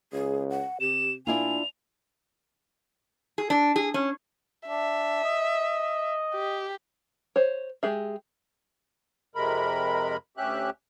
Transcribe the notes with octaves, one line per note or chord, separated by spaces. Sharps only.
C#2 G#4
F#5
C3 G4 E7
A#2 D4 E4 F4 G#5 F7
G#4
D4
G#4
C#4
D4 E5
D#5
G4
C5 C#5
G#3 G4 G#4 E5
F2 C3 G#3 A#4 B5
D2 C#4 G4 E5 F#6